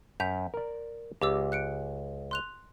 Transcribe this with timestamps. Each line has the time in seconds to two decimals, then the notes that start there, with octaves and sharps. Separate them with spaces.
0.20 F#2 G6 B6 F7
0.54 A#4 D5
1.22 C#2 G4 D6 E6
1.52 F#6 C#7 D7
2.31 C6 F#6 F7